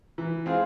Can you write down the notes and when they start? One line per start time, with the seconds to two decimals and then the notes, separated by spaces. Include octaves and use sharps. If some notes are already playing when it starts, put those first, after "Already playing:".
0.18 E3
0.46 G#3 C4 F4 G#4